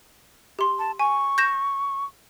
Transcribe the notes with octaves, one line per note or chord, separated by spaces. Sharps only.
G4 C6
A5
G#5 C#6
G6 A#6 E7